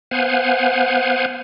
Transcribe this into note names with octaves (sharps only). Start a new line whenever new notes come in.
B3 C5 F5 F#5 G#5